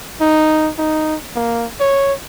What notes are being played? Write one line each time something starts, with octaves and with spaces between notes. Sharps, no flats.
D#4
D#4
A#3
C#5